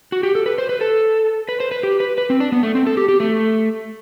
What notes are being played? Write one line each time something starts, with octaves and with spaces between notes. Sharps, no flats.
F#4
G4
A4
B4
C5
B4
A4
B4
C5
B4
G4
B4
B4
C4
D4
B3
A3
C4
A4
G4
G4
A3